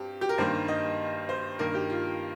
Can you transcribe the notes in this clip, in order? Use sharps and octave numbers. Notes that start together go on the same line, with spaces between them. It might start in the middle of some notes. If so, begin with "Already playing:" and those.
Already playing: G2 C4 G4
G4
A#4
G2 D#3 G3 A#3 C5
D#5
C5
G2 D#3 A#3 A#4
G4
F4